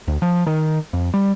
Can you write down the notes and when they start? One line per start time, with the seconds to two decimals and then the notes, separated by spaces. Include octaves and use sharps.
0.08 D2
0.22 F3
0.47 D#3
0.93 F2
1.14 G3